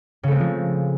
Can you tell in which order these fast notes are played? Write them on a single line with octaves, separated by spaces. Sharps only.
C#3 A3 C4 G#3 F3